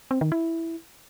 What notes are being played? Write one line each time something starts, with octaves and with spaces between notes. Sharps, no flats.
C4
D#3
E4